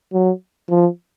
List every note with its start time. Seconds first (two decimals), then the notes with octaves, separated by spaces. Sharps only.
0.13 F#3
0.70 F3